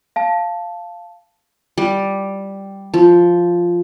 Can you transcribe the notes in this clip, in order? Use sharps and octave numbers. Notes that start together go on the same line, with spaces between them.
F5 A5
G3
F3